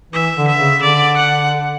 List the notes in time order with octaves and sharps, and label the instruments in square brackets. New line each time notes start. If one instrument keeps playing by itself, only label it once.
[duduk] E3 [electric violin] E5
[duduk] D3
[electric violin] E5
[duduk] C#3
[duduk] D3 [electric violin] D5
[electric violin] F#5